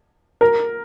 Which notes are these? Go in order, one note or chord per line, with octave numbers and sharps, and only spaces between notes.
A#4